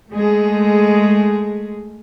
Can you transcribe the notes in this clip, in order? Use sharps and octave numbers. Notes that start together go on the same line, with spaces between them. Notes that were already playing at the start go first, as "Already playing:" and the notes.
G#3 A3 G#4